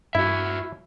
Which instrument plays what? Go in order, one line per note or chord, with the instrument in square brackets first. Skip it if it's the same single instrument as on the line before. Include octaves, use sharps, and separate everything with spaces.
[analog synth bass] G2 [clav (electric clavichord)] E4 [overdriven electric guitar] F#4 E5